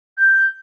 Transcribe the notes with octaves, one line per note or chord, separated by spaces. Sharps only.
G6